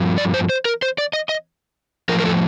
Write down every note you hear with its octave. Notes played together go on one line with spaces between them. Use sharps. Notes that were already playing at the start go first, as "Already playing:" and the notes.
Already playing: G2 F3
D5
C5
C5
A#4
C5
D5
D#5
D#5
A2 F3 A#4
A#4
A4